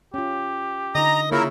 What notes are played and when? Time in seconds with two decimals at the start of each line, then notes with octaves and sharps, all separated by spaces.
0.14 C#4 F4 G4
0.95 D3 D#4 D#5 A#5
1.31 C#3 A#3 E4 F4 A#4 E5